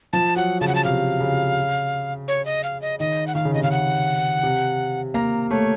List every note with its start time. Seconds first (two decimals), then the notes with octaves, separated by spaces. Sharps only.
0.13 F3 A5
0.36 F#3 F#5
0.61 C#3 A5
0.68 F#5
0.75 A5
0.84 C3 F5
1.20 C#3
2.28 C#5
2.45 D#5
2.64 F5
2.81 D#5
2.99 D#3 D#5
3.27 F#5
3.35 D#3 F5
3.45 C#3
3.54 C3 D#5
3.63 C#3 F5
3.72 F#5
4.43 C3
5.14 A#3 A#5
5.50 A3 C#5